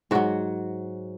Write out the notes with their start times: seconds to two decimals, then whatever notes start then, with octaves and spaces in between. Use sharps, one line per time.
0.11 G#2 F#3 F#4